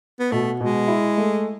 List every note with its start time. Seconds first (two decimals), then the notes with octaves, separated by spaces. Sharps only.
0.20 B3
0.32 B2 A3
0.60 B2 G#3
0.88 E4
1.18 A3